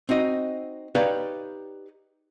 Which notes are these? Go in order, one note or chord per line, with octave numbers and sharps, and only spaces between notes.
C4 D#4 F#4 D#5
D#4 G4 B4 C#5 D5 F5